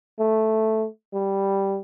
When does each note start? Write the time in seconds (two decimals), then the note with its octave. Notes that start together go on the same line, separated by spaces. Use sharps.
0.19 A3
1.14 G3